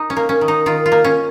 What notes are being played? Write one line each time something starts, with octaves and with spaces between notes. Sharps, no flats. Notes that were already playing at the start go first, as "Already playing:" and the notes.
Already playing: D#4
C#4
A#3
C#4
D#3
D#4
D#3 F4
F4
A#3
C#4